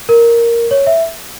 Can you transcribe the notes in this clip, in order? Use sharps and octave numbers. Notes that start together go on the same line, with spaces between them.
A#4
C#5
E5